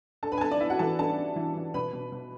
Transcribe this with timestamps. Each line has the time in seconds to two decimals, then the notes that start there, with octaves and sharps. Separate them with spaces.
0.23 D4 A4 A5
0.32 B4 B5
0.38 G#5
0.41 B3 A4 A5
0.51 D4 D5
0.60 B3 E4 E5
0.70 F#4 F#5
0.79 E3 A4 A5
0.99 B3 A4 A5
1.18 D4
1.36 E3
1.55 E3
1.74 B2 B4 B5
1.93 B2
2.12 B2